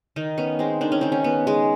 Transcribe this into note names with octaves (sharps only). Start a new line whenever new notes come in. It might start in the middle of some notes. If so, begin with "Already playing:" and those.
D#3 D#4
B3 C#4
G#3 C4
D#3 D4
C#4
D#3 C4
C#4
B3
G#3